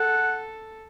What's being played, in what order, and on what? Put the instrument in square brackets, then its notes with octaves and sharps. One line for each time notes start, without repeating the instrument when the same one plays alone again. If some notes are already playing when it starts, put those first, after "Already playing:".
Already playing: [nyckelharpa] A4 [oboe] F#5